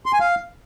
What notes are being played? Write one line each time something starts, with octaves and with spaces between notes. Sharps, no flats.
C6
G#5
F5